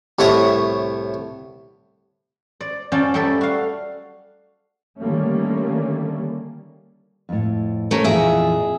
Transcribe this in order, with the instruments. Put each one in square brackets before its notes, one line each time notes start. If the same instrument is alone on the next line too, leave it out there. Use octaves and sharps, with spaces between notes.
[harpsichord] C2 A2 C#5 E5 C#6 D#6
[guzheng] D5
F#2 C#4 F4 D5 G5 A5
G3 A3 G4 A4 D5
F#4 F5
[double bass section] D3 D#3 G3 A3 A#3 C#4
[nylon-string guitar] F2 A2
[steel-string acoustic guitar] A3 C#4 A#4
[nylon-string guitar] F2 A#2 E3 [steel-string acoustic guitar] G#4 E5